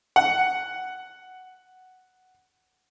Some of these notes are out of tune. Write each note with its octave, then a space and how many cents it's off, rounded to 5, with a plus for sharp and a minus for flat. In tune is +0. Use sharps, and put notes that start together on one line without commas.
F#5 +5